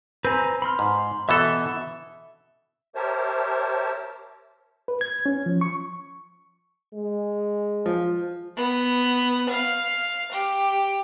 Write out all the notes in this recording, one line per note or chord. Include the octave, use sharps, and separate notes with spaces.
C4 B4 G#5 A#5
B5 C6 F6
G#2
B2 E3 A4 E5
G4 A#4 C5 C#5 E5 A5
B4
G#6
C#4
F3
C#6
G#3
F3
B3
F5
G4